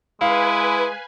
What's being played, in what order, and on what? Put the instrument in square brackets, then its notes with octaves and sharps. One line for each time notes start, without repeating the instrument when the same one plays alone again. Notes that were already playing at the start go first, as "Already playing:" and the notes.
[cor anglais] G#3 [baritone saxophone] E4 [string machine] B4 G#5 [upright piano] F5